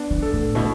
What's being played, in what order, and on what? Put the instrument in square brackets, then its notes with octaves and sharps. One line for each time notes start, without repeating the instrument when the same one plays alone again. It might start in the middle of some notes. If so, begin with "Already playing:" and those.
Already playing: [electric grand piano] B3 D4
[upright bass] E3
[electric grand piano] A4
[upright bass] A2
[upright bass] B2 [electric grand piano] E4